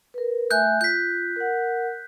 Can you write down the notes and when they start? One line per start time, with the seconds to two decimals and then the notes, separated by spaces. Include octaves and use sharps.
0.14 A#4 B4
0.51 A3 E5 G#5 F#6 G6
0.81 F4 G6 B6
1.36 A#4 F#5